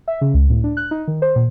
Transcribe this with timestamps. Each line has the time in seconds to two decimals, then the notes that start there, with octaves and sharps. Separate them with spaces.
0.08 E5
0.21 C#3
0.34 C#2
0.50 A2
0.64 D4
0.77 F#6
0.91 D#4
1.07 D#3
1.22 C5
1.36 A#2